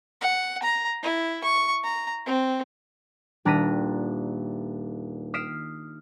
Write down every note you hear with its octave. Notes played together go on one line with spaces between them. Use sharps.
F#5
A#5
E4
C#6
A#5
C4
D#1 D4 A#5 A#6 B6 D#7
D#6 F6 B6 C7 D7 E7